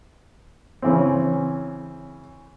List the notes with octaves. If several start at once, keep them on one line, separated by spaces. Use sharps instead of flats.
C#3 E3 C4